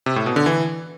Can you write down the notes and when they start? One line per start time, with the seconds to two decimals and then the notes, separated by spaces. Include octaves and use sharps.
0.06 C3
0.16 A2
0.26 B2
0.36 D3
0.46 E3